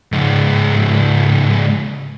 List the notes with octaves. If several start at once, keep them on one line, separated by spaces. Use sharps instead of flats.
C#2 G#2